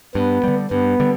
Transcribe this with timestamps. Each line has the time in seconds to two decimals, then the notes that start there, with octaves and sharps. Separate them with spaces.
0.15 G2 B3
0.44 D3 G3
0.71 G2 B3
1.00 D3 G3